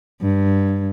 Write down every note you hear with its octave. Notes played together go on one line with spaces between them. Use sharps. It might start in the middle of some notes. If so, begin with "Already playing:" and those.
G2